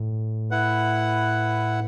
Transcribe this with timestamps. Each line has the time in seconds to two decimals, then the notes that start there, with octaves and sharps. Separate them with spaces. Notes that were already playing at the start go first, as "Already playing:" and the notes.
Already playing: A2
0.51 E4 B4 F#5